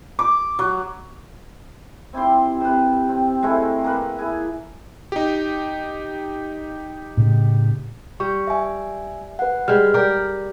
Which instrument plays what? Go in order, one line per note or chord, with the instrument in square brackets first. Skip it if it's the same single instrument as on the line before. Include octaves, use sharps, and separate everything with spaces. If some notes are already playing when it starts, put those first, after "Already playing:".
[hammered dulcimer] D6
F#3
C4 E4 G4 C6
C3 B4
C4
G#3 A3 C4 E4
A#3 B4
E4 G#4
[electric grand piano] D#4 G4
[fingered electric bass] A2 C#3
[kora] G3 [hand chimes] C#6
[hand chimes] E5 G#5
B4 F#5
[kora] G3 G#3 [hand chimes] F6
[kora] G4 A#4 D5